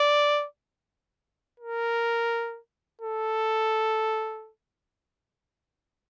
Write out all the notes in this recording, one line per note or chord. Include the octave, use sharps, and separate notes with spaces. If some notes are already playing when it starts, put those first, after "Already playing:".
Already playing: D5
A#4
A4